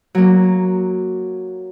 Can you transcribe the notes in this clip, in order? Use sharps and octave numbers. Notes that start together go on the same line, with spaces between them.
F#3 A#3